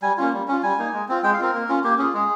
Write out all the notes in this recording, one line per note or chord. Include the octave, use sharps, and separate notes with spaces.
G3 G#5
A#3 C#4 F4
G3
C#4 F4
G3 G#5
A#3 D#4
G#3
C4 F4
G#3 G5
F5
C4 F4 A#4
A#3
C#4 F4
A#3 G4
C#4 F4 G#4
G#3 G#4